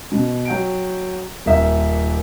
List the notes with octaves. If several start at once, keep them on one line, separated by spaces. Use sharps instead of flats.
B2
F#3 G5 D7
D#1 A#4 E5